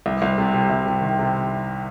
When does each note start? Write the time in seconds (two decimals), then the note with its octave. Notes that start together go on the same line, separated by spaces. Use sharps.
0.06 C2
0.22 C2
0.38 C3
0.54 C3
0.70 C2
0.86 C3
1.02 D#3
1.19 C3